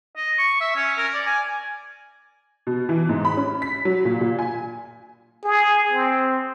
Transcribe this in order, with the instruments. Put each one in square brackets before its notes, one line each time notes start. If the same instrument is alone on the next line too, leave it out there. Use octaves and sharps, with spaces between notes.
[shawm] D#5
C#6
E5
C#4
A#4
D5
G#5
[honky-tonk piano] B2
E3
G#2
B5
C#4
B6
F#3
A#2
A#2
G#5
[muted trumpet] G#4
C4